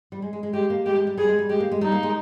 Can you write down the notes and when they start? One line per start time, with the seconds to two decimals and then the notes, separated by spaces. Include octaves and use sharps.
0.12 G3
0.22 G#3
0.33 G#3
0.43 G#3
0.53 G#3 G4
0.70 A#3
0.86 G#3 G4
0.96 G#3
1.07 G3
1.18 G3 G#4
1.28 G#3
1.39 G3
1.49 G#3 G4
1.60 A#3
1.72 G#3
1.81 G3 D#4
1.92 A#3
2.03 G#3